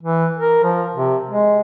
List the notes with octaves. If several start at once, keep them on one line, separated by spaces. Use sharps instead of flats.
E3
A#4
F3
C3
G#3